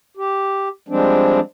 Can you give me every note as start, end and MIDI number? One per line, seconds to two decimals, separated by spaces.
0.17 0.69 67
0.89 1.40 53
0.89 1.40 55
0.89 1.40 56
0.89 1.40 60
0.89 1.40 62